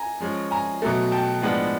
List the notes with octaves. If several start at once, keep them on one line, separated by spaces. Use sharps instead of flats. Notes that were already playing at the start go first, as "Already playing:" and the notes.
Already playing: G#5 A#5
F3 G#3 C#4
G#5 A#5
B2 F#3 A3
G5 A5
A2 F3 G#3 B3 D4